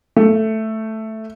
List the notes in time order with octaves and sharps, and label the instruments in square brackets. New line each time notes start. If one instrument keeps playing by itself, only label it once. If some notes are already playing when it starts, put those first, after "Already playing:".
[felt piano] A3